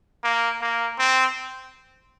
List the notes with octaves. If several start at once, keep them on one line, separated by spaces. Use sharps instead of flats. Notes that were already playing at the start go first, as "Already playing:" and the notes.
A#3
A#3
C4